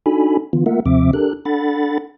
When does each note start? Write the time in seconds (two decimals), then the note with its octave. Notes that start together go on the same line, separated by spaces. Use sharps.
0.06 D4 D#4 F#4 A4 G#5 B5
0.53 D3 E3 B3 F4
0.66 A3 A#3 F4 A#4 E5 F#5
0.86 D#2 C3 F3 C4 E5 D6
1.13 D4 G4 A4 A#4 F#6
1.45 D4 A4 F#5 B5 A6